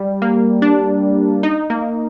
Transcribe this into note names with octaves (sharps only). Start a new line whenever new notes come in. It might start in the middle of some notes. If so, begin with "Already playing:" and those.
Already playing: G3
A#3
D4
D#4
A#3